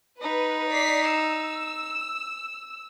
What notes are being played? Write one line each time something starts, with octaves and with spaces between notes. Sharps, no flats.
D#4 B4
D5 B6 C7
E6